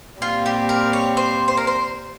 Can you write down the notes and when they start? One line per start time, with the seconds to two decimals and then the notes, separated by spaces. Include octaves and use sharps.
0.21 A#2 G3 C4 F4
0.46 G4
0.69 A#4
0.93 C#5
1.17 C5
1.48 C5
1.57 A#4
1.67 C5